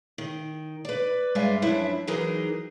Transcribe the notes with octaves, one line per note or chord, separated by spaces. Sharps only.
D#3
B4 D5
G2 G#3 D5 E5 F5 G#5
F#2 F3 D4 E4 E5
E3 F#3 D#4 G#4 A#4